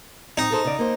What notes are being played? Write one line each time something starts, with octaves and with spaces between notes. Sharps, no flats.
C4 D#4
G#4 A4 C5
C#3 D5
A#3 C5